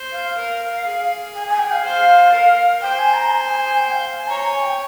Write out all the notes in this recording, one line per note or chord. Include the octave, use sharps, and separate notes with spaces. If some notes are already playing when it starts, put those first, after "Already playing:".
Already playing: C5
F5
A#4
G#4
G#5
G#5
G5
F5
C5
A#4
C5 G5
G#5
A#5
G#5
G#5
G#5
G5
F5
G#5
C#5 A#5
G#5
G5